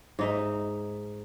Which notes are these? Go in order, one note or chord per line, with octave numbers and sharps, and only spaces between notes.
G#2 D#4 E5